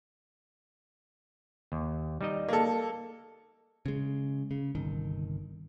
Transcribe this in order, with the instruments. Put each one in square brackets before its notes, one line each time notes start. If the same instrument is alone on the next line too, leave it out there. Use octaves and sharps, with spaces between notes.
[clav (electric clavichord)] D#2
G3 D#4 D#5
[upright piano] A#3 A4
[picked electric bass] C#3 G#3
C#3
G1 C2 D#3